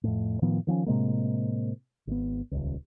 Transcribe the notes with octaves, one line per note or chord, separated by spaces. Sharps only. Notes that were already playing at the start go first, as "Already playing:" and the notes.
F2 A2
A2 D#3 F3 B3
D#3 F3 A#3 C#4
A2 C3 G#3 A#3
G#1 B3
D#1 C#2